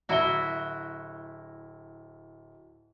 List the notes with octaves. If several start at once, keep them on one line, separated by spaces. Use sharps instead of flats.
D1 E4 F#4 A#5 G7